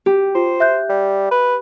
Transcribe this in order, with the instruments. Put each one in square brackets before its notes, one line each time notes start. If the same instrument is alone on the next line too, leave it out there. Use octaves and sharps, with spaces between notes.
[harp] G4
[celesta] F4 [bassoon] C5
[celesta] E5 F#6 G6
[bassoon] G3
B4